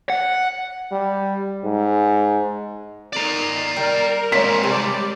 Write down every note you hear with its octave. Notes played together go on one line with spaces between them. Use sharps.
F#5
G3
G#2
D#3 D5 A#5
G3 A#4
G#3 A#3 C4 C#5 B6
C3 G3 D5